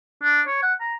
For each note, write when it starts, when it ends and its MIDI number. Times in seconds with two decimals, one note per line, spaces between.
0.23 0.41 62
0.47 0.59 73
0.63 0.74 78
0.81 0.95 82